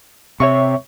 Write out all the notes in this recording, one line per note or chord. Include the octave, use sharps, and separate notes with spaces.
C3 C#5 E5 C#6